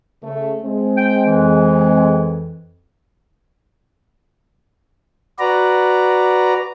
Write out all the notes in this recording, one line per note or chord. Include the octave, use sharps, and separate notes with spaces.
C#3 A3
G#3 C4
G5
F2 E3
F#4 B4 D5 A#5